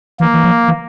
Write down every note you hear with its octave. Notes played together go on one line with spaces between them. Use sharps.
E3 A#3
E3
F3
E3